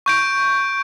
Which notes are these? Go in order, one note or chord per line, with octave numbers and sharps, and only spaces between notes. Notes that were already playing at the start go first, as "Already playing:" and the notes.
C#6 G6 D7